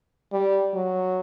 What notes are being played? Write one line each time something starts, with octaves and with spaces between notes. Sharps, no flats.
G3
F#3